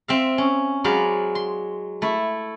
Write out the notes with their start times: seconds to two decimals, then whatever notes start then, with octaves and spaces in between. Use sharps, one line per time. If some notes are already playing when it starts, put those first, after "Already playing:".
0.08 C4 E5 F5
0.38 C#4
0.84 F#3 G#3 C5 D5 F5 B5
1.35 C6
2.02 A3 E4